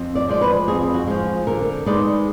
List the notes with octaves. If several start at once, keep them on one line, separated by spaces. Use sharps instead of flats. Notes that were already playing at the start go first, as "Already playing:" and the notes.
Already playing: F2
D5
F3 G#3 D5
B4
F2 G#4
F#4
F3 G#3
D3 A#4
G#3 B3 D#4 D5